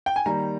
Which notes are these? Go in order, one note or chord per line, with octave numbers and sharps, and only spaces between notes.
G5
G#5
D#3 G3 A#3 A#5